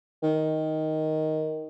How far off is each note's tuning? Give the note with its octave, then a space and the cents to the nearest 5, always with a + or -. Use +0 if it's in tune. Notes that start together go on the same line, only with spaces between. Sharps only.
D#3 +5